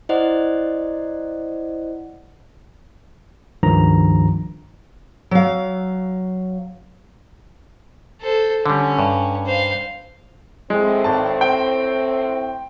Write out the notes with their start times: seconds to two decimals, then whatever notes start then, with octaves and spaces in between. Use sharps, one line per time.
0.09 E4 C5 D5 D#5 F#5
3.63 C#2 G2 D#3 F3 A#5
5.31 F#3 F5
8.22 A4 C5
8.66 D3 G3 C#4
8.99 G2
9.46 C5 F5
10.70 A2 G#3 C4
11.04 G#1 A5
11.41 C5 G5